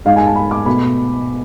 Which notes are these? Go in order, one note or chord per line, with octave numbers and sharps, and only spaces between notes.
G#2 G#3 F5
G#5
A5
B5
D6
B2 A3 B5